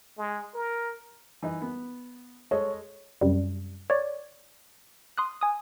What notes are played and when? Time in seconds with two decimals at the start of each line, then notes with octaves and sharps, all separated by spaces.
0.18 G#3
0.54 A#4
1.42 E3 D#4
1.62 B3
2.51 G#3 A4 C#5 D#5
3.21 F#2 C3 G3
3.90 C#5 D5
5.18 C6 D#6 F#6
5.41 G#5 D#6